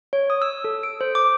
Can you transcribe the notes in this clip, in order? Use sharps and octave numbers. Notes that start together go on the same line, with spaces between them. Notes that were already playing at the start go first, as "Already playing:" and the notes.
C#5
D#6
E6
A4
D7
C5
D6